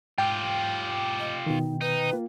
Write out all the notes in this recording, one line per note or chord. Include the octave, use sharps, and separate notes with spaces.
G#2 F4 G4 G5
D#5
B2 D#3 D#4
D#4 B4
A#3 F4